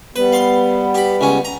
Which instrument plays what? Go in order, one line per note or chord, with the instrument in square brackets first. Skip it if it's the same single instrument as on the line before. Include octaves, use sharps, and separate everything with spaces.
[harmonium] G3 B3 [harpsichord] B4
[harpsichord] F5 C6
G4 B5
C#2 C#4
A#5